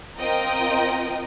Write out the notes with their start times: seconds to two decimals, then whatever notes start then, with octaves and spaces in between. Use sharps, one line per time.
0.18 C4 F4 A#4 D#5 G5